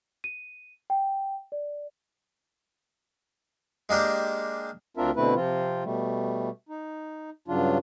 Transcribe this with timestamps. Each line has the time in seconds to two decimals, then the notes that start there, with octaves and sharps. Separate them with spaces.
0.24 D#7
0.90 G5
1.52 D5
3.89 G#3 A#3 D4 G4
4.97 D2 C4 D4 F4 A#4 E5
5.16 B2 D3 A3 C4 E4 B4
5.35 C3 F3 C4 F4
5.84 B2 G3 A3
6.69 D#4
7.48 G2 C#3 F#3 D4 F4